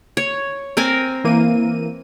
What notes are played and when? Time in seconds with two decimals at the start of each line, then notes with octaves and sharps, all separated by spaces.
0.17 C#5
0.77 C4 A#4 G#5
1.24 E3 A#3 D#7